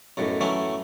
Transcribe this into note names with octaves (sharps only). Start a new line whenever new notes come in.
B1 F#2 A2
E3 F#3 A3 C#4